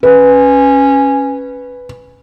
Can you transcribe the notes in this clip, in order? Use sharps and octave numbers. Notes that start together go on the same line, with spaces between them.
C#4 B4